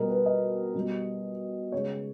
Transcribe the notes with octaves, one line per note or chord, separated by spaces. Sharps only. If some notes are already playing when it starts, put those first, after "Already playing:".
Already playing: B2 G3 A#4 D#5
B4
D#5
B2 G3
C#3 G#3 C#5